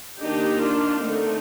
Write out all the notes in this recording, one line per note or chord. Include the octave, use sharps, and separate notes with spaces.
D#3 A#3 D4 D#4 G4
D4 F4
D3 A3 C4 D#4